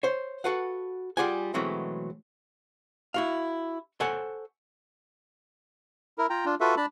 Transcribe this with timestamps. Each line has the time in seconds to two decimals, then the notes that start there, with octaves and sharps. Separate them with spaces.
0.03 C5 C#5
0.44 F#4 A4 B4 F5 F#5
1.17 G3 F4 G4 G#4 F#5 G#5
1.54 B2 E3 F#3 G#3 A3 C4
3.14 E4 F#4 F5
4.00 A4 C5 C#5 F#5 G#5
6.18 E4 A#4
6.30 F4 G5 A#5
6.45 D4 F4
6.61 F4 F#4 A4 B4 E5
6.77 D4 A5 B5